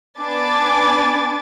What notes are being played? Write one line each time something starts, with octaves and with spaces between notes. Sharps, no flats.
B3 D4 B4 G#5 D6 A6